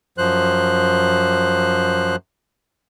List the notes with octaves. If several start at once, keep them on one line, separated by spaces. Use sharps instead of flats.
F#2 F3 C5 F#6